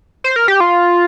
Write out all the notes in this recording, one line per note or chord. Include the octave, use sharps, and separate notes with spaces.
C5
A#4
G4
F4